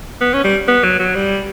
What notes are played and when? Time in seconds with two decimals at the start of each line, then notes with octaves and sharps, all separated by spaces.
0.21 B3
0.34 C#4
0.44 G3
0.68 B3
0.84 F#3
0.99 F#3
1.15 G3